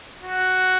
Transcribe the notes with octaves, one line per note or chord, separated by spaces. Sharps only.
F#4